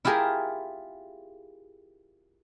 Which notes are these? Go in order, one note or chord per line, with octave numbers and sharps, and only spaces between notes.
E4 F4 G4 G#4 A#4 E5